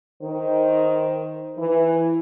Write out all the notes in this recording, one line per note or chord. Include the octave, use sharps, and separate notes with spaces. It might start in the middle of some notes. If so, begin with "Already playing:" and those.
D#3 C5
E3 E4